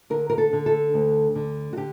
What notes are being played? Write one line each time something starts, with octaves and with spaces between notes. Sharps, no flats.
D3 A#4
A#4
A4
D3
A4
D2
D3
F#4
D3 G4